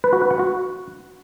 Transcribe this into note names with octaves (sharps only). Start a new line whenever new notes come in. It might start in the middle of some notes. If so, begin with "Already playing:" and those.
B4
F#4
B4
F#5
F#4